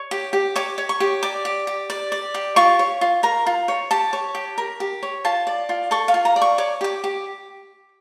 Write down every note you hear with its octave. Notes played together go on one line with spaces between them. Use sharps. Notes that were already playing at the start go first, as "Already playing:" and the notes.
Already playing: C#5
G4
G4
C#5 D6
C#5
C#6
G4
D5 D6
G4
G4
D5
D5
G4
F4 C#6
C#5
F4
A#4 A#5
F4
C#5
G4 A5
C#5
G4
A#4
G4
C#5
F4 A5
D5
F4
A4 C#6
F5
F4
A#5
D5
C#6
C#5 D6
G4 D6
G4